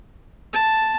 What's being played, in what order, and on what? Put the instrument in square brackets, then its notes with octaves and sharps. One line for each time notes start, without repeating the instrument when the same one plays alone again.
[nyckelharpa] A5